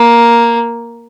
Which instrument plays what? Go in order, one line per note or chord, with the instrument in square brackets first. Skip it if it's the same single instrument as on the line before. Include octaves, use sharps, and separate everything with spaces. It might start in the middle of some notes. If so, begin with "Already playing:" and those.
Already playing: [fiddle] A#3